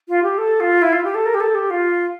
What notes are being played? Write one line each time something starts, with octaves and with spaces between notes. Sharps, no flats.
F4
G4
A4
F4
E4
F4
G4
A4
A#4
G4
A4
G4
F4